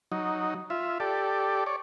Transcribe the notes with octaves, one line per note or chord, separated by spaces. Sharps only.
F#3 D#4
F4 E5
G4 A4 D5
C#5 D5